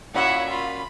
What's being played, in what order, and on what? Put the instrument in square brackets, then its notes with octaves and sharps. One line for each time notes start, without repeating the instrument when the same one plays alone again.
[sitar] A#2 C#4 F#4 [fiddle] E4 E5 [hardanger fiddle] C#5 F#5
[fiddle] F4 [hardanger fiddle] B5